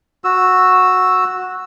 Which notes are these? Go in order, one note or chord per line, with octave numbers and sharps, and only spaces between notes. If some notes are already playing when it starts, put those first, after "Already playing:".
F#4 E6